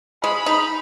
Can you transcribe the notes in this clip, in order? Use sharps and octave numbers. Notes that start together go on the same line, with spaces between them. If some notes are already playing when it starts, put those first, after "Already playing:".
G#3 B5
D#4